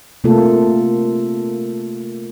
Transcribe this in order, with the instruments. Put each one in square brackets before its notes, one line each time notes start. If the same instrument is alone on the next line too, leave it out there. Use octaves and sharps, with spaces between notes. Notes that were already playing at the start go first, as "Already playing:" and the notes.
[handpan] C3 A3 A#3 F4 A4